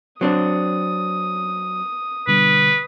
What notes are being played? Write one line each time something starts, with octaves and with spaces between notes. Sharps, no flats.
F#3 C4 D4 D#6
B2 D3 G3 B4